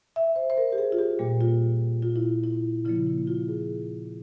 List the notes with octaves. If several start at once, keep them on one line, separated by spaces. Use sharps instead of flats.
E5
C5
C5
A#4
G4
G#4
F4
G4
A#2 G3 A#3
F4
F4
E4
E4
C#3 F3 A#3 E4
E4
F4
G#4